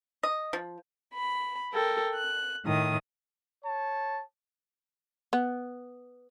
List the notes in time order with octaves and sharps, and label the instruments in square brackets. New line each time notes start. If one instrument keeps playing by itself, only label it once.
[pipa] D#5
F3
[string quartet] B5
A4 A#4 G5
F#6
A2 D#3 D#6
[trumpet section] C#5 A5
[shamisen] B3